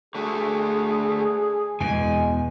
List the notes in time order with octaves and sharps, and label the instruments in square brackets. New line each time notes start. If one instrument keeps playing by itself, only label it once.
[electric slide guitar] D3 A3 F#4 [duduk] G#4
[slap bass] E2 B2 [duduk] G#3 [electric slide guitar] G#5